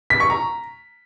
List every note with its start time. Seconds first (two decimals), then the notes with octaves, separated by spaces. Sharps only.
0.10 B6
0.20 C#6
0.30 A#5